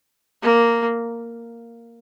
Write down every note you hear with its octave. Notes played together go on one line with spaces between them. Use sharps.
A#3